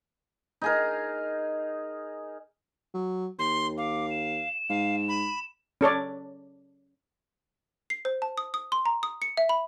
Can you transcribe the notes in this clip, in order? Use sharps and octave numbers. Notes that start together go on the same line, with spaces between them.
D#4 G#4 A#4
F#3
D#2 C6
F5 D6
E7
G#2 F5
B5
C#4 A4 C#5 D5
C7
C5
A5
D#6
D#6
C6
A#5
D#6
C#7
E5
B5